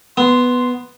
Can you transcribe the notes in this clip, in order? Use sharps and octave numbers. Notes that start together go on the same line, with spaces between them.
B3 C6